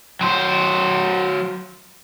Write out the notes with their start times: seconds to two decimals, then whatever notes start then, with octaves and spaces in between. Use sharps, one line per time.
0.21 F#3 C5